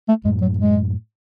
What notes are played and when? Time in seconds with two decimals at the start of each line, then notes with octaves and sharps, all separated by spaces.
0.08 A3
0.25 F#2 A2 G#3
0.41 F#3
0.58 G#3